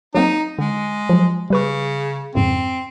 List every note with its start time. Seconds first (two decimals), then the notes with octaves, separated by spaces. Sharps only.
0.15 F#3 A#3 C4 D#4
0.59 D3 G#3
1.09 F3 F#3
1.50 C#3 G3 B4 C#6
2.35 F2 G#2 C#3 C4